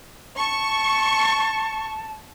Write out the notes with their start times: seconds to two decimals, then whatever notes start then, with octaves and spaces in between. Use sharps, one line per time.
0.38 A5 C#6